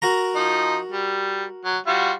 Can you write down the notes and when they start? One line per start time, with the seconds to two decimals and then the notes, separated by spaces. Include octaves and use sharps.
0.02 F#4 A#4 A#5
0.36 F3 D#4
0.92 G3
1.65 F#3
1.87 G3 F4 F#4